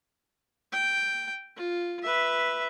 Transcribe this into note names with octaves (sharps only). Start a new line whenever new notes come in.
G5
F4
B4 E5